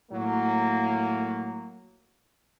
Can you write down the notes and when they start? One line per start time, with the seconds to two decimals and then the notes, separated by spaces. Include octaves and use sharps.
0.12 A2 F#3 A#3